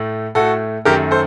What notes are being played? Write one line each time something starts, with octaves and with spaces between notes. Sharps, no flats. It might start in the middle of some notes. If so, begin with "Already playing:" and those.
Already playing: A2 A3
A2 A3 F#4 A4
F#2 D#3 A3 G4 A#4
A4 C5